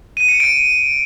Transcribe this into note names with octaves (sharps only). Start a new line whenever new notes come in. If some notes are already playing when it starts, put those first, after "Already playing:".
D#7
C#7
D7